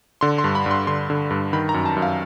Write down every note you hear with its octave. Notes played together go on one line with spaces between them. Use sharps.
D3 C6
C6
G2
B5
G2 C6
D3 C6
D3
G2
D#3 B5
A#5
F#2
A5
F#2
F5